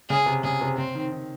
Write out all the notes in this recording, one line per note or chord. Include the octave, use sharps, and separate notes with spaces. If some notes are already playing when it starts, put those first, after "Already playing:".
C#3 G#4
C3
C#3 G#4
C3
C#3 C4
D#3
D#3